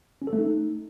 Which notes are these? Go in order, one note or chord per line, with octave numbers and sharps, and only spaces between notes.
C#4
A4
A3
D#4